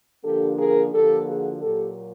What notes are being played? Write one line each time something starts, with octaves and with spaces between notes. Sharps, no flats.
D3 F3 A#3 D4 G4 A4
G#4 A#4
D3 F3 A#3 G4 A4
F#4 G#4
A#2 F#3 A#3 G4 A4